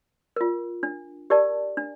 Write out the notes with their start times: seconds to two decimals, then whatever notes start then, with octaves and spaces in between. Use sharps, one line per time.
0.36 F4 A#4
0.83 D4
1.30 G4 A#4 D5 A5
1.77 D4